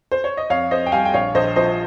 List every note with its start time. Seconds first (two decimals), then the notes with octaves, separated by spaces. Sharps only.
0.12 C5
0.24 C#5
0.37 D#5
0.50 F2 C#5 F5
0.71 F2 C5 D#5
0.86 G5
0.92 G3 F5 G#5
1.05 G5
1.14 A#1 C#5 F5
1.35 A#1 C5 D#5
1.56 F3 C5 D#5